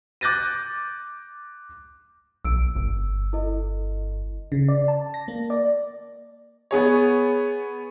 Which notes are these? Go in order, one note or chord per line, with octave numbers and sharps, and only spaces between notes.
D6 F#6 G6 A6 A#6 D#7
B1 E6 D7
G1
E4 A4 D#5
C#3
D5
A5
A#6
A#3
D5
B3 G#4 C#5